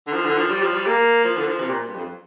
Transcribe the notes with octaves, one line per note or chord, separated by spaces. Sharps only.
D3
F3
D3
F3
G3
F3
G3
A#3
F3
D3
F3
C3
A#2
G2
F2